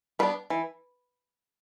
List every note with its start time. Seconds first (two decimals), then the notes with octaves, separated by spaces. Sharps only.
0.19 G3 B3 D4 B4
0.50 E3